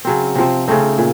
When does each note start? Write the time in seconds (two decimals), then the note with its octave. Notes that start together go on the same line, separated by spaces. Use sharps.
0.05 C#3 F#3 C4
0.35 C3 F3 C4
0.68 C#3 A3 C4 D#4
0.98 A#2